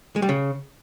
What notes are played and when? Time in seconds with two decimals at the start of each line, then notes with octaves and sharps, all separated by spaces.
0.16 G#3
0.22 G3
0.29 C#3